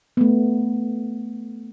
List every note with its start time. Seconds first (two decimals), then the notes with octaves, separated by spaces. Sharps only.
0.17 A3 B3